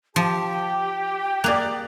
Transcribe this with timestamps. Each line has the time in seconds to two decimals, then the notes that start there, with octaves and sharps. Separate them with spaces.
0.16 F3 G4 A5
0.54 G5
1.44 A#3 G#4 D5 F#6